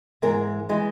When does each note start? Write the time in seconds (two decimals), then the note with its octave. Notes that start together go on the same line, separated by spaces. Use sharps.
0.22 G#2 E3 G#3 A#4
0.69 E3 G#3